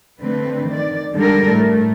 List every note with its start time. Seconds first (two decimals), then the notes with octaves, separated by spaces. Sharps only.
0.22 D3 A3 C4 B4
0.66 D#3 D5
1.14 D3 G3 G#3 D4 A4 A#4
1.51 A2 A3